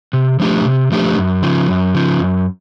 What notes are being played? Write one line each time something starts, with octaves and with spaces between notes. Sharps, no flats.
C3
F3 A3 D4 G4
C3
F3 A3 D4 G4
F#2
C#3 F3
F#2
C#3 F3
F#2